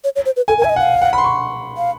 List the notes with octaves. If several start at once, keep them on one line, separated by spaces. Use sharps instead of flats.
C#5
C#5
C5
B4
A4 G#5
A#4
G#5
E5
D#5
F#5
F5
F#5
B5
C6
C#6
F5